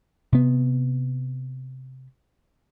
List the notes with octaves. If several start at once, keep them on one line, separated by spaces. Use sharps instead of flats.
C3 B3